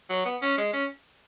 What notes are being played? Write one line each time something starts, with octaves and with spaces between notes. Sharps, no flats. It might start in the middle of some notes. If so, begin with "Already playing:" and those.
F#3
B3
C#4
G#3
C#4